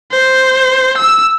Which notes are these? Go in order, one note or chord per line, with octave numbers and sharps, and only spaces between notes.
C5
E6